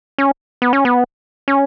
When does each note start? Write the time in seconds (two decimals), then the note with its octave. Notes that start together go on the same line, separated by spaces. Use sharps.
0.18 C#4
0.62 B3
0.73 C#4
0.85 B3
1.48 C#4